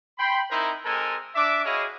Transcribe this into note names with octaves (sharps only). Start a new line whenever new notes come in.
G5 B5 C6
C4 D#4 E4 A#4 C5
G#3 C4 A4 A#4 G#5
D4 E5 D6
E4 F#4 G#4 C#5 D#5 F5